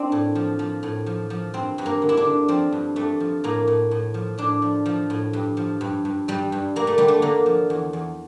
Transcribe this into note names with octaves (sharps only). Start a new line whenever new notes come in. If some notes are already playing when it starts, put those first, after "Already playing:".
Already playing: C4 D4
A2
F3
F3
A2
F3
F3
G2 C4
G2
A#3
D3
E4
D4
D3
F3 C4
G2
G2 A3
F3
A2 A#3
A2
A2
F3
A2 D4
F3
F3
A2
G2
F3
G2
G2
G2 G3
G2
G2 A#3
A3
D3 G3
A3
D3 A#3
F3
E2
E2